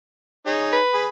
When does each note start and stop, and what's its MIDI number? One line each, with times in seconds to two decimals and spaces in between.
0.46 0.77 63
0.46 0.77 68
0.46 0.77 73
0.73 1.07 71
0.94 1.07 68
0.94 1.07 83